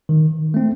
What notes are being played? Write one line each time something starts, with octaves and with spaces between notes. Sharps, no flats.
D#3
A3 C4